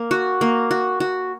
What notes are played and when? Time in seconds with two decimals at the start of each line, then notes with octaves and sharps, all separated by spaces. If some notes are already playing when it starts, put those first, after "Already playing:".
Already playing: A#3
0.11 F#4
0.41 A#3
0.71 F#4
1.00 F#4